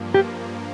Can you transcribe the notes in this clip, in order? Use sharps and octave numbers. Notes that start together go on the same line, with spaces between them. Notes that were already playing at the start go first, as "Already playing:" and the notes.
Already playing: G2 F3 A#3
G4